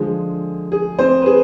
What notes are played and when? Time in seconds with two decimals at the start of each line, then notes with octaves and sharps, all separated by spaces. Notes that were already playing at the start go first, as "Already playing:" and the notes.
Already playing: D3 F3 G#3 G#4
0.72 G#4
0.99 C4 C5
1.22 B4
1.26 G#4